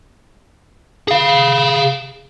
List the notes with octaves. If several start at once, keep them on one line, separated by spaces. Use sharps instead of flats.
G#4 F5